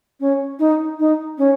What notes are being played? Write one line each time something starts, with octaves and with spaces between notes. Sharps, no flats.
C#4
D#4
D#4
C#4